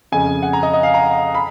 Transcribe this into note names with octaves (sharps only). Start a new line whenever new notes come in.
F2 C#3 G#5
F#5
A#5
D#5
D#5
F5
A#5
B5